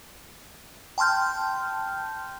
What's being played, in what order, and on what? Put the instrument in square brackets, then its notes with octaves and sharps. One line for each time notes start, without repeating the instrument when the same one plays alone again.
[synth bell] G5 A5 C6 F6 G6